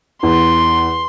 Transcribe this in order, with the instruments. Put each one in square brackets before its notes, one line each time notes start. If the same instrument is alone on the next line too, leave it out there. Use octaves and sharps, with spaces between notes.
[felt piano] E2 [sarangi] C6